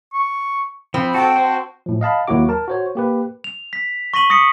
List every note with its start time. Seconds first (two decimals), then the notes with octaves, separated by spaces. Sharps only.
0.13 C#6
0.94 F3 C4 B5
1.14 F#4 A4 G5 A5
1.36 F#4 C5
1.86 A2 F3
2.01 D#5 F5 A5 B5
2.27 D#2 F#3 A#3 E4 F#4 D6
2.49 A#4 A5
2.68 F#4 C5 C#5
2.95 A#3 G4 B4
3.44 F7
3.73 B6
4.14 C#6 A#6 B6 D#7 F#7
4.30 D#6 A#6 B6 C#7